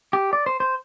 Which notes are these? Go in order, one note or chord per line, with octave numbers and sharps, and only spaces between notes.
G4
D5
C5
C5